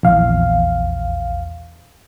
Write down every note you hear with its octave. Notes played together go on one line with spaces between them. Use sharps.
A#1 E2 F5